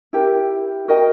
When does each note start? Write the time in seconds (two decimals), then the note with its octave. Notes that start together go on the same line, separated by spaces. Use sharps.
0.13 E4 G4 A#4
0.88 F#4 A#4 D#5 G5